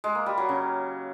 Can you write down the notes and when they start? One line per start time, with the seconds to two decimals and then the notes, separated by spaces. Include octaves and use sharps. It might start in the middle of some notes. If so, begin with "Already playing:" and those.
0.04 G#3
0.15 A#3
0.26 G3
0.38 F#3
0.49 C#3